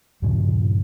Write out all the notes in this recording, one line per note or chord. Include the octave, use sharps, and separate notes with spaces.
G2 A#2 C#3 F3